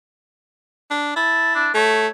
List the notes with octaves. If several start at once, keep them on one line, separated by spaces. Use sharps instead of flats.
D4
E4 A5
D4
A3 C#5